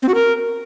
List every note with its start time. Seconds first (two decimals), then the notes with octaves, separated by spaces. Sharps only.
0.02 C4
0.08 F#4
0.14 A#4